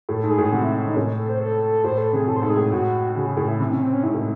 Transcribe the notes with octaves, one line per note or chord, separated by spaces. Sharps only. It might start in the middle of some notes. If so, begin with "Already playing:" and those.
A2 A4
G#2 A4
G#4
A2
C3 F#4
E4
C3 D#4
A2 C#4
A4
C5
A4
A4
A2 C5
A4
C3 G#4
A2 A4
C5
G#2 A4
G#4
A2
A2 F#4
C#3 F#4
G#4
A2 G#4
E4
C3 E4
C#4
C4
C#4
G#2 E4
A2